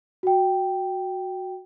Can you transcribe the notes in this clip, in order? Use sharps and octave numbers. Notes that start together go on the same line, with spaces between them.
F#4 G5